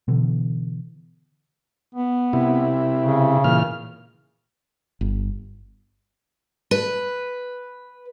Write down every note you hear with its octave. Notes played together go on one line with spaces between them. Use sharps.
B2 D3 E3
B3
C3 E4
C#3
A#2 E3 F6
G1
B4